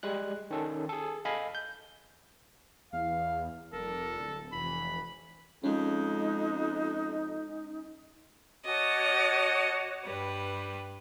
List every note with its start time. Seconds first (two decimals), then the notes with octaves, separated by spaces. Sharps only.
0.03 G3 G#3 F#6
0.51 D#3 C#4 A4
0.89 G#4 A4
1.25 A4 D#5 F5 G#5 B5
1.55 G6
2.93 E2 F5
3.73 F1 G3 A4 A#4
4.19 D1
4.52 F1 E3 B5
5.64 F2 G#3 C#4 D#4
8.65 F#4 C#5 D#5 A5 D6
10.05 G2 G3 B4